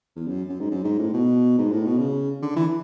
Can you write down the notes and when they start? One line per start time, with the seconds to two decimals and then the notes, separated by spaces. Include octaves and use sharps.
0.16 E2
0.27 F#2
0.49 F#2
0.60 G#2
0.70 F#2
0.84 G#2
0.99 A2
1.13 B2
1.58 G#2
1.72 A2
1.86 B2
1.99 C#3
2.42 D3
2.56 E3